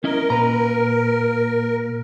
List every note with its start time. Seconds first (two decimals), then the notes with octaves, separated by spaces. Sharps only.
0.04 C#4 E4 A#4 D#5
0.30 A#2 B4 A#5